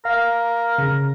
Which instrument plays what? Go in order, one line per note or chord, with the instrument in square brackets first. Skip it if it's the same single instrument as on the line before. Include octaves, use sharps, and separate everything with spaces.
[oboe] A#4 [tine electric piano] F5
[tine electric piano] C#3